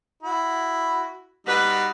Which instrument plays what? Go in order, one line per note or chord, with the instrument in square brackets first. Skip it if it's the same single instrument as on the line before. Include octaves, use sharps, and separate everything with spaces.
[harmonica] E4 F#4
[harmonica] G3 D#4 F#4 [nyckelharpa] B4